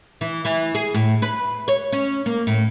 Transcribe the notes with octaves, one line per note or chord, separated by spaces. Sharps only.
E3
E3
G#4
A2
B4
C#5
C#4
A#3
A2